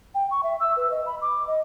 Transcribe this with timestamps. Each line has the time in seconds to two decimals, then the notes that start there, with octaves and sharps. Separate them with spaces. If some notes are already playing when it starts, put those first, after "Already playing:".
0.15 G5
0.31 C#6
0.43 E5
0.60 E6
0.77 B4
0.91 D#5
1.06 B5
1.22 D6
1.47 D#5